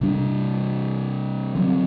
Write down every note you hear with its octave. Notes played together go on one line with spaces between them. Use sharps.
C3 G3 D4
D3 F#3 C4